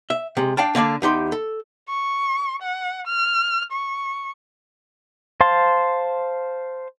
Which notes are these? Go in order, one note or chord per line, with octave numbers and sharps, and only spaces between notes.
E5
C3 G#3
D4 F5 G5 A5
D3 A#3 C4 D4
E2 D#4 G4 C6
A4
C#6
F#5
F6
C#6
C5 F5 A5 C6